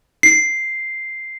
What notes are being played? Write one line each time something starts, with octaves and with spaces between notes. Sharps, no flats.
C7